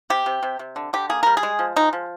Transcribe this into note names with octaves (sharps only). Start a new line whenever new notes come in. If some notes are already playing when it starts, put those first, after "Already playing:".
C3 G4
C3
C3
C3
D3
D3 G4
A#3 G#4
G3 A#4
G#4
G#3
F3
G#3 D#4
F3